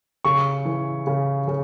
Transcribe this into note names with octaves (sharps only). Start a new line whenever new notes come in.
C#3 C#6
E3
C#3
C#3